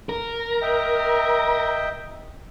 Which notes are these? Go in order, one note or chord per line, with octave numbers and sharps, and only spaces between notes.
A#4
D#5 E5 G5